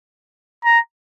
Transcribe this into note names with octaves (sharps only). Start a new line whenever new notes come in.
A#5